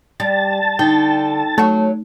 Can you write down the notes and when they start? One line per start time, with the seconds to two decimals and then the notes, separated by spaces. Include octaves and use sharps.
0.20 G3 A5
0.79 D3 D#4 G5
1.58 F#3 A3 F#4